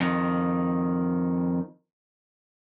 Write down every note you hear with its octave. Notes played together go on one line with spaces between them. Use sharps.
F2 D#3